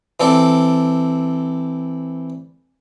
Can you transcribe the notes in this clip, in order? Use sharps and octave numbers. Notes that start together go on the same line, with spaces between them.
E3 C4 A4 D5